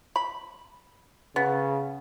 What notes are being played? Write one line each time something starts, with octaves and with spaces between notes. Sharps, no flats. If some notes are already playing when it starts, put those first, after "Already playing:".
B5
C#3 B3